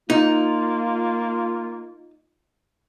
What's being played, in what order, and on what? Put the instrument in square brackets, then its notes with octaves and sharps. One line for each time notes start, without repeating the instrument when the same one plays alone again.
[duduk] A#3 [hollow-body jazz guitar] D#4 [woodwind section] F4